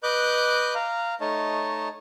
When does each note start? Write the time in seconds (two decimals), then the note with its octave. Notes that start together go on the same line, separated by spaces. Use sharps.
0.03 B4 D#5 D6 F#6 G6
0.75 F5 A#5
1.21 A3 D#4 C#5 D#5 A5